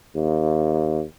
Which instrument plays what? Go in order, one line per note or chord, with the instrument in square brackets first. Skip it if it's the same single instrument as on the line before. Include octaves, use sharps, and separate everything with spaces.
[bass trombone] D#2